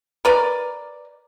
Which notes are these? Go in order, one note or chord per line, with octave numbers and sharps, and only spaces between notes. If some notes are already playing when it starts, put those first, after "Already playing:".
A#4 B4 D5